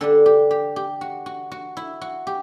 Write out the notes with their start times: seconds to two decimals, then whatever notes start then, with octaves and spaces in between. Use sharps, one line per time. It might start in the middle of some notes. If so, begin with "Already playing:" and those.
0.01 D3 G3 D4 A4
0.26 G4
0.51 G4
0.76 G4
1.01 F#4
1.26 F#4
1.52 F#4
1.77 E4
2.01 F#4
2.27 G4